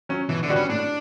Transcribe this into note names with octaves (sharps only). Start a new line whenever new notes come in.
F#3 C#4
B2 E3
D3
G3 B3 D4 F#4
C#4
A2 D4